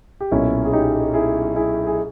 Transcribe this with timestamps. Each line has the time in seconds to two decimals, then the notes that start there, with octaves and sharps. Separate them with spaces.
0.21 G4
0.31 B1 A#2 C#4 E4
0.65 G#4
0.73 D#4 G4
1.14 E4 G#4
1.56 E4 G#4
1.87 G#4